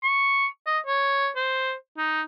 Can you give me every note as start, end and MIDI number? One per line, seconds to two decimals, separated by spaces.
0.03 0.46 85
0.67 0.79 75
0.87 1.28 73
1.36 1.74 72
1.98 2.22 63